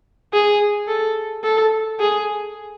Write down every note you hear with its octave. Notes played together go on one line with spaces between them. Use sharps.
G#4
A4
A4
G#4